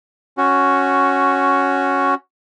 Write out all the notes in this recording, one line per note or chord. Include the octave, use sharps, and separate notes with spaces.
C#4 F#4